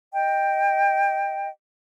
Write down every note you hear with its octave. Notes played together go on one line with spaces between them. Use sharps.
D#5 G5